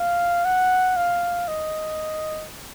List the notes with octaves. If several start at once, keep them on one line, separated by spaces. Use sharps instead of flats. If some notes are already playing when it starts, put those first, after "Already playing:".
Already playing: F5
F#5
F5
D#5